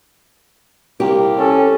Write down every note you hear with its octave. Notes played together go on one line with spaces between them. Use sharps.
C2 A#3 G4
C#4 A4